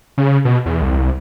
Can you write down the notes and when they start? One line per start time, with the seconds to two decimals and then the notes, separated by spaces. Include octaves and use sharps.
0.18 C#3
0.45 B2
0.66 E2
0.82 C2